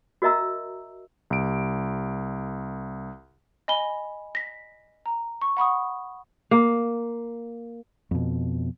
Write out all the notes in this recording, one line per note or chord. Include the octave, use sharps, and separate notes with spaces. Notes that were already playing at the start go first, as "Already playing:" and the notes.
F#4 A#4 D#5 E5 A#5 E6
C2 D7
D#5 G#5 B5 G7
A#6 B6
A#5
C#6
F#5 B5 C#6 D#6
A#3
F2 B2